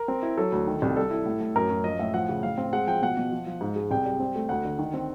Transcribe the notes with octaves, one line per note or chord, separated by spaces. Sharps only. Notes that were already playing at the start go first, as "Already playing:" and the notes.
Already playing: A#4
C4
E4
F#3 A4
D2
D#3
C2
G3 A4
E4
A2
A2
F#2 A#4
F#2
F3 D#5
A2 E5
F3 F#5
C#3
A2 F5
C4
G#3 F#5
F3 G5
B2 F#5
B2
F3
F3
G#2
G#3
C2 G5
G3
C4
A3
D2 F#5
D3
D#3
C4